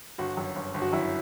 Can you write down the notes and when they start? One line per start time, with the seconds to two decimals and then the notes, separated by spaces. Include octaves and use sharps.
0.18 G1 F#4
0.37 F#2
0.56 G1
0.74 G1
0.82 F#4
0.92 F#2 E4